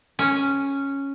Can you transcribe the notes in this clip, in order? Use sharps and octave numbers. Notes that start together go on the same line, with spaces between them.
C#4